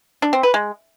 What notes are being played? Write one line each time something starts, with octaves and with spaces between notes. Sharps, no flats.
D4
C4
B4
G#3